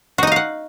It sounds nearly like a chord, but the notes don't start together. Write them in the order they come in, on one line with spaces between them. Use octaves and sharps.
F#4 D#4 D#5 F5 F#5